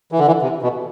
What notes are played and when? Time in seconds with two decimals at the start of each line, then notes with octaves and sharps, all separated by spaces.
0.12 E3
0.19 D3
0.27 E3
0.42 C3
0.62 B2